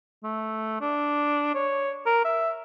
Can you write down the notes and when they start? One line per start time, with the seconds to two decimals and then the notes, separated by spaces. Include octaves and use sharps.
0.23 A3
0.81 D4
1.55 C#5
2.06 A#4
2.25 E5